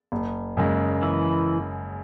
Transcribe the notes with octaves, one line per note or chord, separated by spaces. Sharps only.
F#1
F#2 C#3 G#3
E3 E4